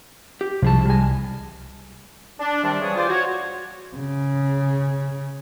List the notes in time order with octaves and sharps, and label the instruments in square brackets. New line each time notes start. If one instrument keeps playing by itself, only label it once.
[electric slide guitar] G4
[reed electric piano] C2 [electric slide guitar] F3 G#4 A5
[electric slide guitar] G3 G#5
[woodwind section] D4
C3 D#3 G3 D4
C#3 E3 G3 C#5 D#6
F4 C5 D5
F#4 C#5
[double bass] C#3